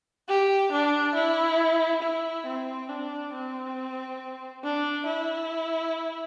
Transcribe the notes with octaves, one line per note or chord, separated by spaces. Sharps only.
G4
D4
E4
E4
C4
D4
C4
D4
E4